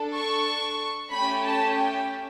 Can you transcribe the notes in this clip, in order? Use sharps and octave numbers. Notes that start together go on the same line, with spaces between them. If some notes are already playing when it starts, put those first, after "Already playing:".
Already playing: D4 A4
C#6
A3 C#4 G4 B5
A5
G5